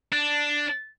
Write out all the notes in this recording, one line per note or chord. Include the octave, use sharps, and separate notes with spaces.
D4